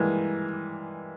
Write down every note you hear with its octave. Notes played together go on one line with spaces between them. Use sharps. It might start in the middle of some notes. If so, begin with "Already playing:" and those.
Already playing: E3 G3 G#3 A#3